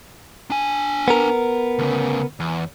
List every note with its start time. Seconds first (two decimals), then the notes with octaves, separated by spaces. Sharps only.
0.50 D4 G#5
1.08 B3 A#4
1.79 D2 C#3
2.40 E2